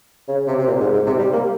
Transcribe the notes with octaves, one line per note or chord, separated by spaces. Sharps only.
C#3
C3
C3
A#2
G#2
G#2
C3
G3
A#3